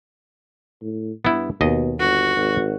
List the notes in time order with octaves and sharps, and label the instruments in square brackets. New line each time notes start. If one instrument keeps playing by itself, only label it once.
[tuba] A2
[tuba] G2 [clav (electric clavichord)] B3 E4
[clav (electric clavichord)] D#2 D#5 [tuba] B2
[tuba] G1 [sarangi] F#4
[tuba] G#1